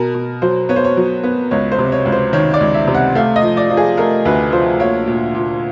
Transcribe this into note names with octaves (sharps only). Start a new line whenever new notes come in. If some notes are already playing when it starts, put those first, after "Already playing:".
Already playing: B2 A#4
B2
F#3 C5
B3 C#5
C5
C#5
F#3
B3
C#2 C#5
C5
C3
C#5
C#2
C5
D#3 C#5
D5
C#2
E5
C3
F#5
A3 F5
D#5
F3
D5
F3
G#4
A3 A#4
D2 B4
F3 C5
A#3 C#5
A#2
A#2